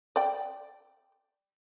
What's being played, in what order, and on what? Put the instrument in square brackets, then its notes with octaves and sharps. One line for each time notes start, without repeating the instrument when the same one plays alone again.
[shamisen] D5 G5